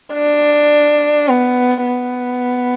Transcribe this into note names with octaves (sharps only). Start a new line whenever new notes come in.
D4
B3
B3